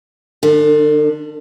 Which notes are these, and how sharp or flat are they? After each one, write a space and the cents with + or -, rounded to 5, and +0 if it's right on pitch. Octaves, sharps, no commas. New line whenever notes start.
D3 +45 D4 +0